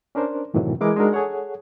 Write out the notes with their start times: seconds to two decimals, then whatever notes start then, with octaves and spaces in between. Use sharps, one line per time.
0.15 C#4 D4 A#4 C5
0.54 F#2 A2 C3 D#3 E3 F#3
0.81 E3 G#3 E4 A#4 D6
0.97 G#3 D4 D#4 F#4 A#4
1.13 G#4 A4 C#5 F#5